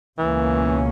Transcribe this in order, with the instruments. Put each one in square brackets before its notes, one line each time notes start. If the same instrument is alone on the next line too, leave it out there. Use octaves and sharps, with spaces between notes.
[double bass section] C#2 B2 A#3 C#4 [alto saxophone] E3